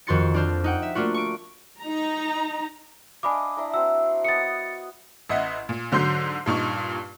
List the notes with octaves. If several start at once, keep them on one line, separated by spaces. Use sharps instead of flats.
F2 D#3 F#4 C6 A6 C#7
D4 F4 C5
D#4 F#5 G5
E5
A3 A#3 D4 F4 F#4
C#6 D7
D#4 A#5
D4 D#5 F5 G#5 B5 D6
D4 E4 A#5
C4 F#4 E6
B3 D#5 D#6 A6 C#7
A1 D#5 E5 F#5
A#2
G#2 D3 F#3 C6 G6 C7
G2 A#2 D#4 C#6